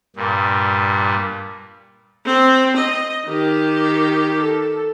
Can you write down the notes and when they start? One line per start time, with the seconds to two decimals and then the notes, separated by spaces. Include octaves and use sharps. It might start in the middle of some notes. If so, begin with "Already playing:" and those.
0.16 G2 A#2
2.25 C4
2.76 D#5
3.27 D#3 G4
4.40 A4